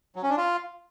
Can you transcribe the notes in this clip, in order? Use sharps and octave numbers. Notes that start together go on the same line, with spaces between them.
F#3
C#4
D4
F4